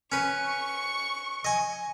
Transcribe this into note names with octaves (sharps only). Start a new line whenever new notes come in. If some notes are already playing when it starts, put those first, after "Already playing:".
C#4 B4 C#6
D#5 G#5